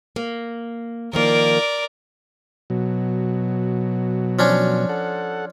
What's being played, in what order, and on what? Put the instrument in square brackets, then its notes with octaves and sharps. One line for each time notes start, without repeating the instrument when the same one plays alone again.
[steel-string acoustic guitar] A#3
[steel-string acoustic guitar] D#3 F3 A#3 [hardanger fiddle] A#4 D5
[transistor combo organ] B2 F#3
[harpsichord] F3 C#4 D4
[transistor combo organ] A4 F#5